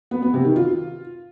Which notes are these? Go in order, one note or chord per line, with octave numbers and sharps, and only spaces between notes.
B3
B3
C3
D#3
F4